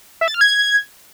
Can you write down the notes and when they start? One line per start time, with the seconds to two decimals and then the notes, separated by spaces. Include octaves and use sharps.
0.21 E5
0.28 A6
0.34 F6
0.41 G#6